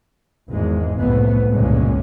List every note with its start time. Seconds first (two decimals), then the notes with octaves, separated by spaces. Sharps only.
0.49 G#1 E2 G#3
0.99 F#1 C2 F2 A2 A3 B3
1.50 G1 C#2 A#2 D3 G#3 C#4